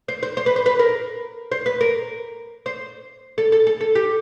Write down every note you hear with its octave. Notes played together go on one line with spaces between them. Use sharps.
C5
C5
C5
B4
C5
B4
A#4
C5
B4
A#4
C5
A4
A4
A4
A4
G4